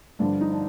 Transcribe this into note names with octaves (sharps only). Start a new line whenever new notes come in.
G2 D3 F3 D4
D#4
D4